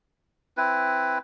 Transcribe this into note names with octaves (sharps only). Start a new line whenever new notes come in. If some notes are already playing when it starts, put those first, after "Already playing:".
C4 E4 B4